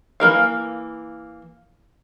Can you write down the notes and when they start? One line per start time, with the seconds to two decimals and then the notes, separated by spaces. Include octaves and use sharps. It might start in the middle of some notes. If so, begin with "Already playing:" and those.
0.20 E3 A#3 A#4 F5